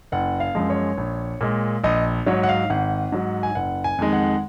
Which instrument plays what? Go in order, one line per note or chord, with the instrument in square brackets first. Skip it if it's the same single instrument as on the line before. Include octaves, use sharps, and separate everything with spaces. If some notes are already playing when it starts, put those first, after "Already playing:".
[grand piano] F#1 F#5
F5
F#2 F3 G#3
C#5
A#1
A#2 G#3
A#1 D#5
G#2 F#3 C#5
F#5
F5
G#1 F#5
G#2 F#3
G#5
F#1 F#5
G#5
F2 D#3 G#3
F#5